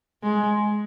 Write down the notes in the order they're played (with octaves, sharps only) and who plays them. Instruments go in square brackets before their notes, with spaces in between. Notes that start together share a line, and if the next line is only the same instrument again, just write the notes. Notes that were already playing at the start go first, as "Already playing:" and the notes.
[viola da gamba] G#3